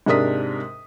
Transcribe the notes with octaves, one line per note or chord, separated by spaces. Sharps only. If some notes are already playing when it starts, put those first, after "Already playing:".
G#2 C3 D4 A#4 D#6 B6